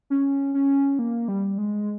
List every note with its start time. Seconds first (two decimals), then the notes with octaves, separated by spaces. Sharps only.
0.10 C#4
0.54 C#4
0.99 A#3
1.28 G3
1.58 G#3